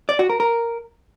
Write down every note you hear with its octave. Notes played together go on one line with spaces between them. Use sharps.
D5
F#4
A#4
A#4